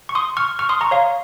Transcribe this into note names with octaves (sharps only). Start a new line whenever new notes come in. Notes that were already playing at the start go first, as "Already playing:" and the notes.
C#6
C6 D#6
C#6 F6
C#6 F6
C6 D#6
A#5 C#6
C#5 F5